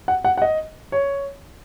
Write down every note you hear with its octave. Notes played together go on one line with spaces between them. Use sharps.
F#5
F#5
F#5
D#5
C#5